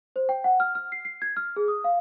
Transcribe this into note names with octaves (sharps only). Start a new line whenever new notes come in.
C5
G5
F#5
F6
F6
C7
C7
G#6
F6
G#4
D#6
F5